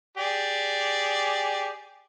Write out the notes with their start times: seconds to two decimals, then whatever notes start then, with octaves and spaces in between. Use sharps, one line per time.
0.17 G4 G#4 D5